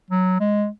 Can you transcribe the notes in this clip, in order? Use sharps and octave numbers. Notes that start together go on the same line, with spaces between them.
F#3
G#3